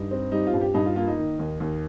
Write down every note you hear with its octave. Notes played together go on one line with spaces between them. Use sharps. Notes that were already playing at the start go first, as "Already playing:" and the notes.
Already playing: G2 D#4
C4
G3 D#4
F4
G2
G4
G2 D#4
F4
A#3 F4
D#4
D#3
D#2
D#2